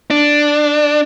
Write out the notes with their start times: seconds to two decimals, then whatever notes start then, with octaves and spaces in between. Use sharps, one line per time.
0.11 D4